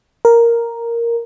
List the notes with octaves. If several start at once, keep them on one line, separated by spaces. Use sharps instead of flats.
A#4